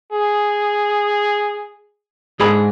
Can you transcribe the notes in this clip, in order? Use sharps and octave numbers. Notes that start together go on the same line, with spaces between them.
G#4
G#2 D3 G#4 B5